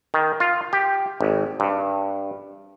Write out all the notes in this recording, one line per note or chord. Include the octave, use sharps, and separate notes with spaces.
D#3
F4
G4
G#1
G2